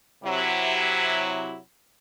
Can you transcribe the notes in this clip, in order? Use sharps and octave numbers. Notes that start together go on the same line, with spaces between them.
C3 F#3 E4